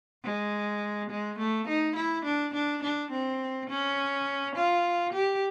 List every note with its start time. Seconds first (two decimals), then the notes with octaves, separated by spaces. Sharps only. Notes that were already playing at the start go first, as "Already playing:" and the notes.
0.24 G#3
1.10 G#3
1.39 A3
1.68 D#4
1.96 E4
2.25 D4
2.54 D4
2.83 D4
3.11 C4
3.70 C#4
4.55 F4
5.13 G4